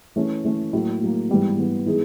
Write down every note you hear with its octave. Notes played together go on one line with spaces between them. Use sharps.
E3 A3 C#4
E3 A3 C#4
A2 F#3 A#3
A2 F#3 A#3
G#2 E3 G3 B3
G#2 E3 G3 B3
E3 G#3 B3 D#4 G#4